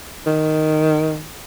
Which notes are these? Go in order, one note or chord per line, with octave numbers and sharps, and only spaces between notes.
D#3